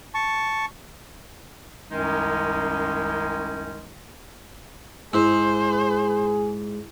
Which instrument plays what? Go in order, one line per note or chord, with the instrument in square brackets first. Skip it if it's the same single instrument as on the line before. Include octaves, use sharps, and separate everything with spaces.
[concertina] A5 C#6
[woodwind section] C2 F#2 D#3 G#3 C#4 D#4
[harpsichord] G#2 [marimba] E4 [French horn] G#4 [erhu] C5